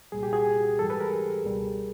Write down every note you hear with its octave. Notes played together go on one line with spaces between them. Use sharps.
C2 A#2 G3 G#4
G4
F#4 G#4
G#2 E3 G3 G4 A4
A4 B4
G#4 A#4
C#2 B2 G3